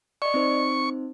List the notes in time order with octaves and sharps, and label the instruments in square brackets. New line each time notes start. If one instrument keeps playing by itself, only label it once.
[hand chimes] D5 D#5 [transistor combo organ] C#6
[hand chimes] C4 D#4 C5